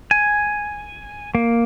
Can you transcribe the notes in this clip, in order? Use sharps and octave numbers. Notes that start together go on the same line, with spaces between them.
G#5
A#3